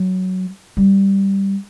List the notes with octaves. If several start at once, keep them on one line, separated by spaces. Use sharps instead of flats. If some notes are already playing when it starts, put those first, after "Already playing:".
Already playing: F#3
G3